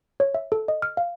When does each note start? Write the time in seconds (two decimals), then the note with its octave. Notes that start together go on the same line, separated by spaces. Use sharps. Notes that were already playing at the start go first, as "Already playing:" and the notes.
0.20 C#5
0.34 E5
0.52 A4
0.68 D#5
0.82 F6
0.97 F5